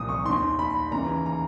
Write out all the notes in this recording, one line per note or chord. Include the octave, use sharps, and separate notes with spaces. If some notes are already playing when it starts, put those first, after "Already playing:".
Already playing: C2 A#2 F3 D#6
C#6
D#2 D#3 C6
B5
D#2 C#3 E3 A#5
A#5